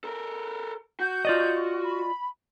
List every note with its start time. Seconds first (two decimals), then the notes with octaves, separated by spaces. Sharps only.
0.04 A4 A#4
1.00 F#4 G6
1.25 F4 D5 D#5
1.84 B5